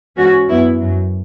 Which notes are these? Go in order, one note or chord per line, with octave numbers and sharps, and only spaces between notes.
G#2 E3 C#4 F#4
F#2 E3 B3 E4
F#2 F#3